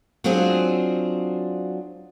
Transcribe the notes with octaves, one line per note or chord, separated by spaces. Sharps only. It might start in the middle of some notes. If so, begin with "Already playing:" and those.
F#3 C4 D4 F4 F#4 G#4